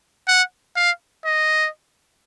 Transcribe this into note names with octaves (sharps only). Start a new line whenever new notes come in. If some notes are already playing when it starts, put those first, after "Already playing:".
F#5
F5
D#5